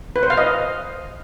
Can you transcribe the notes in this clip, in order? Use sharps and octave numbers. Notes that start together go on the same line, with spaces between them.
B4
C5
F5
D#5